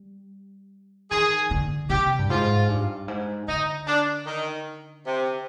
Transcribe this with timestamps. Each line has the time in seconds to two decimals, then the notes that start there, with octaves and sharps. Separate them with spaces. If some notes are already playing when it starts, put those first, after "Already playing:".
Already playing: G3
1.11 D#3 G#4
1.51 D3
1.90 C3 G4
2.19 G2
2.30 G#2 F4
2.69 G2
3.08 G#2
3.48 D3 D#4
3.87 D4
4.26 D#3
5.06 C3